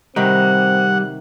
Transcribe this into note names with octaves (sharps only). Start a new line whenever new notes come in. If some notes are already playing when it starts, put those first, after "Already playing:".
C3 D#3 G3 C4 F#5